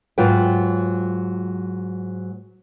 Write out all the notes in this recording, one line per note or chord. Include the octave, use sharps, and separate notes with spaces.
G#2 F#3 F4 B4 G5